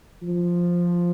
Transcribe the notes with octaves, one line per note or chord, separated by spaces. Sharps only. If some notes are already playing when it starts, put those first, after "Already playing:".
F3